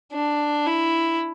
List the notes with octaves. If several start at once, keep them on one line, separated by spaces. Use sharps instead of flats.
D4
E4